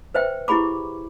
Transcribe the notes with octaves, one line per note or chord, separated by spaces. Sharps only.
B4 C5 E5 G5
E4 G4 G#4 B5 D6